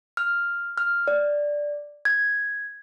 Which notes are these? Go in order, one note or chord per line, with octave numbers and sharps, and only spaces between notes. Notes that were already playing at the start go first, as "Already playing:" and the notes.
F6
F6
D5
G#6